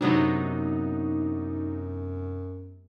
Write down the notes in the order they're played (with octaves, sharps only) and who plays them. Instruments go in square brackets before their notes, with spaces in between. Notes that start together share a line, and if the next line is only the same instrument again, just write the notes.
[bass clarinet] F#2 [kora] C3 F#3 B3 [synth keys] D4 D#4